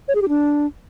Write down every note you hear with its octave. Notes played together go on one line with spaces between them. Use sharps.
C#5
G#4
G4
D4